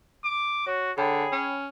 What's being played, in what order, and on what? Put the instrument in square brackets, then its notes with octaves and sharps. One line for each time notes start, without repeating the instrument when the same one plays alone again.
[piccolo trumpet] D6
[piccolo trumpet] F#4 [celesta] C#5
[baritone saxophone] D3 [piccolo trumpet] G#4 [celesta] C#5 G5 B5
[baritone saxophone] C#4